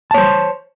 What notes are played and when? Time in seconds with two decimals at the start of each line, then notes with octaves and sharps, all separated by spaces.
0.11 A5
0.14 C#5
0.18 C5